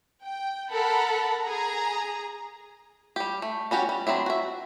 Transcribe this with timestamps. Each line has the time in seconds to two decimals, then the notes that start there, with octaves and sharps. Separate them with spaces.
0.24 G5
0.72 A4 A#4 F#5 A5 B5
1.44 G#4 A#5
3.16 G3 G4
3.42 A3
3.71 G3 C#4 F#4 G4
3.89 G3
4.07 F#3 C4 D4 E4
4.26 F#4 E5